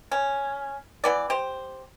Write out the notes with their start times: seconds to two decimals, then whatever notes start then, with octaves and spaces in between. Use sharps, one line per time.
0.11 C#4
1.04 E3 B3 D5
1.30 G4 C5